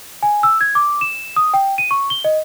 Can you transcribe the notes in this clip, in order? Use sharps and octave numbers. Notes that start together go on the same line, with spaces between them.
G#5
E6
G#6
D6
E7
D#6
G5
D#7
C#6
G7
D#5